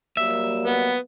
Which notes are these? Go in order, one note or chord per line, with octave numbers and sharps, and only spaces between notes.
F#3 G3 A#3 E5
B3